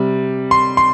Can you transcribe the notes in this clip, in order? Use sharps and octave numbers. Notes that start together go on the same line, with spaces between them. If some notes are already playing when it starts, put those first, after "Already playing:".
Already playing: C3 G3
C6
C6